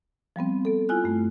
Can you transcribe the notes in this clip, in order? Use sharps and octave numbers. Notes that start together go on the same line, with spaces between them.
F3 G3 B3 C4
B3 A4
E4 F4 G#5 F#6
G2 A3